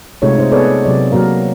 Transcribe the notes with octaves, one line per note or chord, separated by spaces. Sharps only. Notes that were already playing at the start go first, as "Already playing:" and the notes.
C3 G#3 A3 D#4 F4 C#5
D#4 C5 D#5
B3 G#4 A4 B4 C#5 D5
C3 F#3 D5
F#3 A#3 F#4 A#4 F5